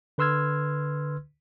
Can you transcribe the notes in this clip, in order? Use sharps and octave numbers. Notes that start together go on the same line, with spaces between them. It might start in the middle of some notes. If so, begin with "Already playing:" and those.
D3 B4 C6 E6 F6 G#6